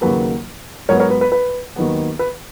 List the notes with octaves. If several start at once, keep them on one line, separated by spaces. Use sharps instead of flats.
D#2 C#3 F#3 A#3 B4
G#2 F#3 B3 A#4 C#5
A#4 C#5
B4
B4
B4
D#2 D#3 F#3 B3
B4